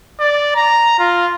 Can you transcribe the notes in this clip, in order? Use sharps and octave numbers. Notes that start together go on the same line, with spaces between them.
D5
A#5
F4